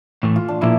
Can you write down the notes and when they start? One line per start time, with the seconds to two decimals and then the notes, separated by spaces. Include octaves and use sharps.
0.23 A2 E3 A3
0.36 F4
0.48 D4
0.62 A#2 F3 A#3 E4